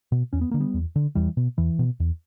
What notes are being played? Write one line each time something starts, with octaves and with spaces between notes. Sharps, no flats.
B2
E2 C#4
B3
D3 A#3
G3 B3
E2
D3
E2 E3 G3
B2
E2 E3
B2
E2